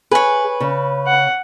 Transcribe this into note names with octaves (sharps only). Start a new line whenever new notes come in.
G#4 B4 C#5
C#3
F#5